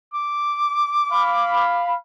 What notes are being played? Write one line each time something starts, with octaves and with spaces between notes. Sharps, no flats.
D6
F5 B5